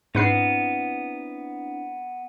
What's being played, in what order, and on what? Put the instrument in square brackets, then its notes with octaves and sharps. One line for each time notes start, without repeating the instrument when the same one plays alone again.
[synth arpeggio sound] G#2 B4 C7 [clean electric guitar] B3 [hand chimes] C4 D4 E4